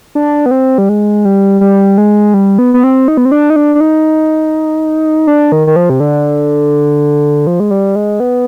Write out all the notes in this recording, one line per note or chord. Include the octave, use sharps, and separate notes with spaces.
D4
B3
C4
G3
G#3
G3
G3
G#3
G3
B3
B3
C4
D#4
B3
C4
D4
D#4
D4
D4
D#4
D4
D#3
D#3
F3
C3
D3
F3
G#3
G3
G#3
B3